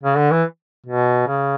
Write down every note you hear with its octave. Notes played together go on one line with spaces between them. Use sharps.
C#3
D3
E3
B2
C#3